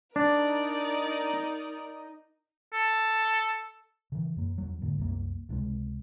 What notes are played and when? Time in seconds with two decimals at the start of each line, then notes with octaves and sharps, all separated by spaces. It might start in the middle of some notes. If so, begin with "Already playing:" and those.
0.16 D4 D#4 A#4 D5
2.73 A4
4.12 C#3 E3
4.36 F#2 A#3
4.58 E2 F#3
4.81 G#2 D3 A#3
4.98 C2 F#2 A#3
5.49 C#2 C3 G3 G#3